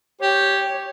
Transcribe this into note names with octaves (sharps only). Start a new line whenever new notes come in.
G4 C#5